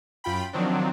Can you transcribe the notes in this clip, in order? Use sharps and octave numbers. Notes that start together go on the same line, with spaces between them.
F#2 F4 G5 B5
D#3 F3 F#3 C4 D4